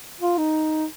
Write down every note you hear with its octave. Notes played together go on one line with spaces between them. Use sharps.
F4
D#4